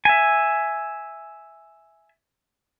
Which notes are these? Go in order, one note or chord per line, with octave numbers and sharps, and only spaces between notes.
E5 G#5